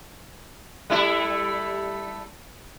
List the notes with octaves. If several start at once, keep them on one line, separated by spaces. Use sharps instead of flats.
G3 A3 E4